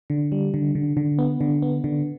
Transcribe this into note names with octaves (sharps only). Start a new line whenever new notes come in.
D3
G3
D3
D3
D3
B3
D3
B3
D3